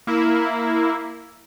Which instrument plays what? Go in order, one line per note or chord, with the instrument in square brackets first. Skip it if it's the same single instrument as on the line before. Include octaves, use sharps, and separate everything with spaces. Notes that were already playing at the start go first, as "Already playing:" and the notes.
[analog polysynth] A#3 E4